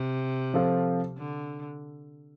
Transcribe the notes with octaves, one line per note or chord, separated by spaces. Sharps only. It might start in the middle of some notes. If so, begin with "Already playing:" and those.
Already playing: C3
F3 C4 F4 A4 C5
D3